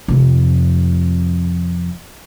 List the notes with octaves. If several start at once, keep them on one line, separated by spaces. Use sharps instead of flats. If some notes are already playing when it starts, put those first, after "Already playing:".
F2 C3